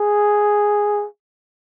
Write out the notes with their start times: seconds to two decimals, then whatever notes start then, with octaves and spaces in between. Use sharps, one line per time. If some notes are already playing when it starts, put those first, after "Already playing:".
Already playing: G#4